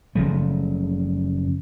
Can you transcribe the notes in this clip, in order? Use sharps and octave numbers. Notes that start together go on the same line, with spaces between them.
F#1 C#3 F3 A3